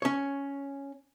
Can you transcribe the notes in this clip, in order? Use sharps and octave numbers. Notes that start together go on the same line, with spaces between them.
C#4 C#5